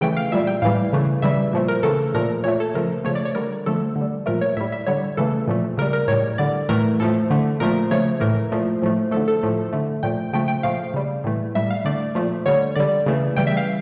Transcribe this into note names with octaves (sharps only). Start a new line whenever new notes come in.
C#3 E3 A3 G5
F5
A#2 G3 E5
G5
A2 E3 G3 F5
C#3 E3 A3
C#3 E3 G3 E5
A#2 F3 A3
A#4
C#3 E3 A3 A4
A#2 F3 A3 A#4
A#2 A3 C#5
A4
C#3 F3 A3 A#4
C#3 F3 A3 C#5
D5
C#5
D3 G3 A#4
D3 F3 A3 A4
D3
G3
A#2 F3 A3 A#4
C#5
A2 G3 E5
E5
D3 G3 C#5
C#3 E3 A3 A4
A#2 F3 A3
C#3 G3 A#4
A#4
A2 G3 C#5
D3 G3 D5
A2 E3 A3 A#4
A2 F3 A3 A4
D3 A3
A#2 F3 A3 A#4
C#3 F3 A3 C#5
A2 E3 A3 A#4
A#2 F3 A3
A2 F3 A3
D3 F3 A3 A4
A4
A2 F3 A3
D3 A3
A#2 F3 A3 G5
C#3 F3 A3 G5
G5
A#2 F3 A3 F5
C#3 G3
A2 E3 A3
A2 G3 E5
F5
D3 A3 D5
A#2 F3 A3
D3 G3 C#5
D3 G3 D5
C#3 E3 A3
C#3 E3 G3 G5
E5
F5